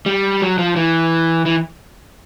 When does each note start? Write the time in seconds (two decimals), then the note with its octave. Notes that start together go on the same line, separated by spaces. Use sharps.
0.06 G3
0.42 F#3
0.58 F3
0.76 E3
1.46 E3